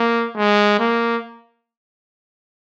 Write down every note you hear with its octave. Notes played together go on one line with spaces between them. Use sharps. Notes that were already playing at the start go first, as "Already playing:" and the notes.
Already playing: A#3
G#3
A#3